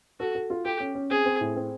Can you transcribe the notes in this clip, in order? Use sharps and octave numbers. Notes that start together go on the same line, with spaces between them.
F#4 A4
A4
F4
G4 A4
C#4
C#4
C4 G#4
C4
A2
C4